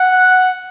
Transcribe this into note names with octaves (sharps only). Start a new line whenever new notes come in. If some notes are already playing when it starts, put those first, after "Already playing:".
Already playing: F#5